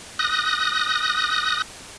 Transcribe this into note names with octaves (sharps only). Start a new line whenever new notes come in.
D#6 F#6 A#6